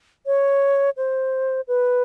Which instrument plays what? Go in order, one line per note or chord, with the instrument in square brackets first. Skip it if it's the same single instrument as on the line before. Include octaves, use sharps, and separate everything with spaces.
[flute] C#5
C5
B4